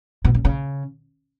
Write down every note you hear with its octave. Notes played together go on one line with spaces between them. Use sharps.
B2
C#3
C#3